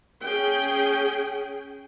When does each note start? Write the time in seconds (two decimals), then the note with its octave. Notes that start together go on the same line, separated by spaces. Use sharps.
0.24 C#4 G#4 G5